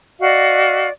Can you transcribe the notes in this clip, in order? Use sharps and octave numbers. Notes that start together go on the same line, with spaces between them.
F#4 D5 D#5 F5